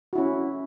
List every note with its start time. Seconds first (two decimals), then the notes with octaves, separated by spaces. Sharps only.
0.13 F#4
0.15 E4
0.18 C#4